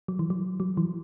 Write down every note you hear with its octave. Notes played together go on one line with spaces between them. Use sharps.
F#3
E3
F#3
F#3
E3